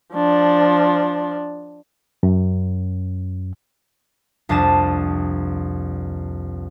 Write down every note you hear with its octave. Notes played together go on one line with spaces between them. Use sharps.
F3 D4
F#2
C2 F2 D4 A5 D#6 E7